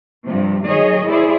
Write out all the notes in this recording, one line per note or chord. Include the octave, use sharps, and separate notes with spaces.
G2 C3 F3
D#3 F#3 G#4 C#5 D#5
E4 G#4 C5 D5